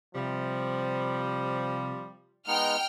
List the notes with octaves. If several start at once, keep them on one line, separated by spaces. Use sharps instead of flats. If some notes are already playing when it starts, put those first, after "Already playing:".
C3 F3 G3
G#3 B3 D#4 G5 F6 C#7